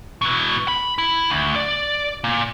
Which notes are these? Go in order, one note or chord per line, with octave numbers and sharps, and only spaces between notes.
B2 E3
B5
E4
D2
D5
A#2